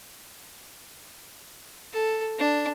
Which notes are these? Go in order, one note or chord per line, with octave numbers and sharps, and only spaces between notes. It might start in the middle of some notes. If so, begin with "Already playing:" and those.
A4
D4